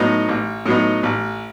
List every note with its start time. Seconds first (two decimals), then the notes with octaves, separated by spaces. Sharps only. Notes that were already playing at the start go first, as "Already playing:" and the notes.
Already playing: A2 F#3 B3 D#4
0.29 A1
0.66 A2 F#3 B3 D#4
1.03 A1